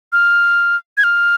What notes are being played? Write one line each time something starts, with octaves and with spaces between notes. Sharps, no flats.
F6
G#6
F6